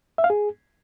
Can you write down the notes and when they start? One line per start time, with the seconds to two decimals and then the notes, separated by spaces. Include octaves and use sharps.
0.18 E5
0.24 F5
0.30 G#4